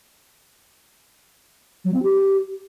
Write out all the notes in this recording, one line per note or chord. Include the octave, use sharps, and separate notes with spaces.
F#3
C4
G4